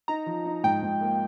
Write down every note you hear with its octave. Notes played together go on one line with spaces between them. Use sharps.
D#4 A#5
F3
D#4
G#2 G5
G#2
A#3